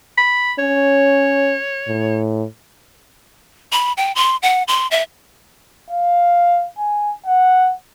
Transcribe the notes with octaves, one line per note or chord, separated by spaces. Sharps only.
B5
C#4 C#5
A2
B5
G5
C6
F#5
C6
E5
F5
G#5
F#5